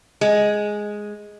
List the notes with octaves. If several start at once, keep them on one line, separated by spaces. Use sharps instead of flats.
G#3